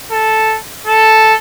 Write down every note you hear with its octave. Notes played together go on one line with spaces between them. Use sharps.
A4
A4